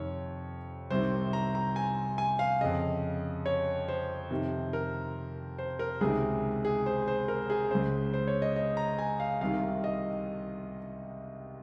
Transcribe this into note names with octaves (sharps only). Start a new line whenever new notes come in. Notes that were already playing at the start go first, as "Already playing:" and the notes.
Already playing: F2 C3 D#3 C#5
C2 C3 D#3 C5
A#5
A#5
G#5
G#5
F5
F2 C#3 D#5
C#5
C5
F2 C3 D#3
A#4
C5
A#4
C#2 C3 D#3 G#4
G#4
C5
C5
A#4
G#4
C#2 C#3 C5
C5
C#5
D#5
D#5
A#5
G#5
F5
C2 C3 D#3 F5
D#5